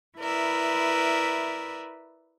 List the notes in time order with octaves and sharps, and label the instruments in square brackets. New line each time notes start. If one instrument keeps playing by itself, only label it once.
[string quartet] E4 A#4 B4 D5 E5